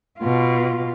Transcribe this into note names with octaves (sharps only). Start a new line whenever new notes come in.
B2 F4